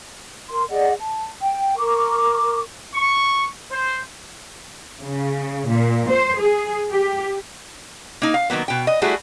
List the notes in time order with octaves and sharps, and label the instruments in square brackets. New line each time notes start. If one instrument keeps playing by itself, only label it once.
[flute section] A#4 C6
G#4 D5 D#5 F#5
A5
G5
A#4 C#6 D6
[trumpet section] C#6
C5
[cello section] C#3
A#2
C5
G#4
G4
[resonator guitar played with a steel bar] A#3 D#4
F5
D#3 F#3 A#3 B3
B2 G5
D#5
G3 A3 E4 F#4 G#4